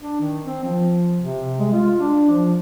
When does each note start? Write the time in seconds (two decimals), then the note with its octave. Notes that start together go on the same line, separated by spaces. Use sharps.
0.02 D4
0.20 D#3
0.44 C4
0.64 F3
1.20 C3
1.59 G#3
1.73 F4
2.00 D4
2.30 F3